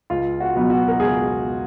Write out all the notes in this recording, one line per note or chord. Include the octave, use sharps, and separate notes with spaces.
C#2 F4
F#4
B2 F#3 B3 D#4
F#4
A#4
C#2 G#4